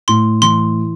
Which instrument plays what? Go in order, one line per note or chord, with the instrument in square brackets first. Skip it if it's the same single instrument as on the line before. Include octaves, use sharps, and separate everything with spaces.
[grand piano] A2 [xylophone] C6
[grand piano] E3 [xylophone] C6